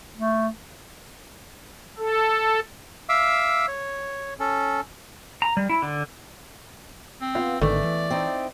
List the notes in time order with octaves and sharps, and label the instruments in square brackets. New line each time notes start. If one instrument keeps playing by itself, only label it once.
[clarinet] A3
[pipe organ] A4
[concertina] E5 F5 D6 E6
C#5
C#4 A4
[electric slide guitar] A#5
G3
E4
D3
[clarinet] C4
[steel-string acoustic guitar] B3 [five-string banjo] F4
[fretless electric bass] G#1 D3 D#3 [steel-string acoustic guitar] E2 [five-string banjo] A3 [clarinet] D5
[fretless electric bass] E3
[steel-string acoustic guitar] C4 D#4 E4